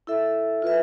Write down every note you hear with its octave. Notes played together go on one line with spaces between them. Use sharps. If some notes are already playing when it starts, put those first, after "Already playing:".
E4 A4 E5
F4 B4 E5